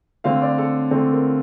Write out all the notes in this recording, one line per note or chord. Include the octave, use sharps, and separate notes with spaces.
D3 A3 C4 F5
D5
A4
D3 A3 C4 A4
A#4